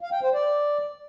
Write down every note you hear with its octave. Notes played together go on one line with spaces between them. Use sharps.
F5
G5
C5
D5